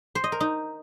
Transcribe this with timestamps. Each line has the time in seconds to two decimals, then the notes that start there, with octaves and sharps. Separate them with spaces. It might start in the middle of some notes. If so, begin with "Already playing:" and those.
0.15 C5
0.24 D#5
0.32 A#4
0.40 D#4